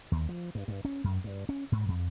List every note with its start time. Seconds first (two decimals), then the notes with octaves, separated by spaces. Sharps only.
0.12 D#2
0.29 F3
0.55 G2
0.68 G2
0.85 C#4
1.04 F#2
1.24 G2
1.49 C#4
1.72 G#2
1.88 F2